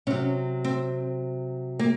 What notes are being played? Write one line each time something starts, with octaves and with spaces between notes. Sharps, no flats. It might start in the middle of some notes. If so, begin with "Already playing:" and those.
C3 F#3 C#4
C4
A#3